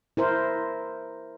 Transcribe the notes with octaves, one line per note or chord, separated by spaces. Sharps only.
E4 A#4 C5